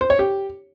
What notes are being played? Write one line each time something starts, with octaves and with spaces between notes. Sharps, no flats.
C5
C#5
G4